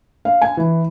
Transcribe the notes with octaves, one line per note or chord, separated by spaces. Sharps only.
F5
G#5
E3